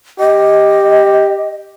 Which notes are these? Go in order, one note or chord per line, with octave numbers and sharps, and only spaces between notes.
G4 D#5